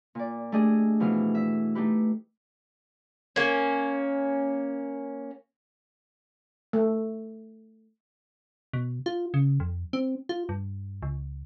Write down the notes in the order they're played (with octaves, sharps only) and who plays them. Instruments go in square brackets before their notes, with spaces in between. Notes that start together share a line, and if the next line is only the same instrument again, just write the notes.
[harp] A#2 D5
A3 D4 G4 G#4 D#5
B2 E3 F3 F5
E5
A3 D#4 G4 B4
[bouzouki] A#3 C#4
[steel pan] A3
[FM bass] B2
F4
C#3
F2
C4
F4
G2
C#2